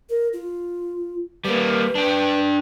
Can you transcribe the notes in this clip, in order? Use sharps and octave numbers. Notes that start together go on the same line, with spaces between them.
A#4
F4
G3 A#3 B4
D4 G5